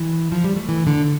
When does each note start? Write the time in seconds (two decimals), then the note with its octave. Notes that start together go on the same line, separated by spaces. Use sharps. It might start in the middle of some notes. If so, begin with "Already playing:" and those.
Already playing: E3
0.32 F3
0.44 G3
0.56 A3
0.69 E3
0.87 D3